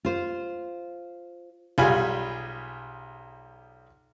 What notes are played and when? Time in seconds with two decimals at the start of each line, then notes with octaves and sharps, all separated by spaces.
0.05 F4 C5
1.78 B1 G3 F4 G#4 G#5 B5